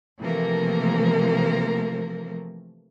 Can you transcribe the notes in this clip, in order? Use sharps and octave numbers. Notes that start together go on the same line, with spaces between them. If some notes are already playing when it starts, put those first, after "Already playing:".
C3 E3 F3 A3 A#3 A#4